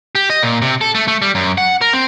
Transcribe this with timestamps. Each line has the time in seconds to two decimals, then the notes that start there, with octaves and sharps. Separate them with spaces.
0.15 G4
0.30 D#5
0.43 A#2
0.62 C3
0.81 A4
0.95 A3
1.08 A3
1.22 G3
1.35 F#2
1.58 F#5
1.81 A#4
1.93 C4